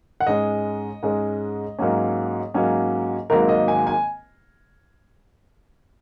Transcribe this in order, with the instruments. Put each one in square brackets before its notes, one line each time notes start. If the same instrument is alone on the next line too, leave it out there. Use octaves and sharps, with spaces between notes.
[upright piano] F#5
G#2 G#3 C#4 D#5
G#2 G#3 C#4
G#2 F#3 A#3 C#4
G#2 F#3 A#3 C#4
G#1 G#2 D#3 F#3 A#3 A#4
D#5
G#5
G#5